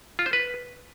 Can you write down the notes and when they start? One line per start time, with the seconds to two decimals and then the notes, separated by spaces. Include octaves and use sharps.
0.19 F4
0.26 C5
0.33 B4